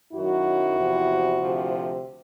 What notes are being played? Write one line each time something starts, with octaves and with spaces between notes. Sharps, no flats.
F#2 D#3 F#3 E4 F#4
E2 C3 F3
D2 C3 F3